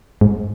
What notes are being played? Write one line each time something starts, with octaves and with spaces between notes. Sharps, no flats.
G#2